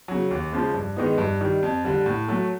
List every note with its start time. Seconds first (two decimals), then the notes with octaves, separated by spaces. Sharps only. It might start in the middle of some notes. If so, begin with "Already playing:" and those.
0.08 C#3 F#3
0.31 D#2
0.52 C#3 F3 G#3
0.74 G2
0.96 D#3 G#3 B3 D#4
1.18 G2
1.41 D#3 G3
1.63 F2
1.84 D3 G3
2.06 A2
2.28 F#3 A3